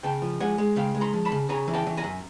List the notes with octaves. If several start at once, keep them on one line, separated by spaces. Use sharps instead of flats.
C#3 G5 A5
F3
G#3 F#5 G#5
G#3
C#3 F5 G5
G#3
A#5 C6
F3
A5 B5
C#3
C#3 G#5 A#5
E3
G5 A5
E3
G#5 A#5
F#2